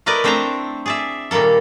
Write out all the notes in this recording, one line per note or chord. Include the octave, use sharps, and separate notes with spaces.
A3 E4 A#4 B4 D5 D#5
A3 C4 D4 C5 A5 A#5
G#4 D5 E5
A#2 D#3 G3 A#3 A4